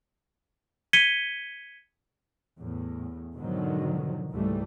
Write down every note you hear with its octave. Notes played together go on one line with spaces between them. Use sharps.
G#6 B6 C#7 D#7 G7
E2 A2
G#2 B2 D3 D#3 F3 F#3
C#2 G#2 E3 G3 A3